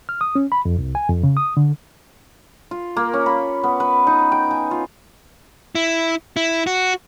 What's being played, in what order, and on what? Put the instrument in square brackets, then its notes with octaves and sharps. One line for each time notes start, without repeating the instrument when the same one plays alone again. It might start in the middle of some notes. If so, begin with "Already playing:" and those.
[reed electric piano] F6
D#6
C#4
B5
F2
C2
G#5
F2
C#3
D#6
D3
[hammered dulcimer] F4
A#3
C#4
B5
B3
B4
D#4
G5
G#5
F4
[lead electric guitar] E4
E4
F#4